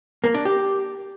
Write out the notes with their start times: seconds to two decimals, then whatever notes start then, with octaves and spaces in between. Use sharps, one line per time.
0.24 A#3
0.34 D4
0.45 G4